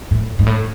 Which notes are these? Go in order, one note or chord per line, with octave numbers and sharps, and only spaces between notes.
A2
G#2
A2